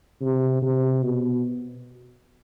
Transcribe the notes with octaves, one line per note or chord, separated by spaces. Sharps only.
C3
C3
B2